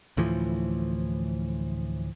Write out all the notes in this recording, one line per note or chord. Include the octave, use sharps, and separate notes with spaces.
D2 A2 E3 F3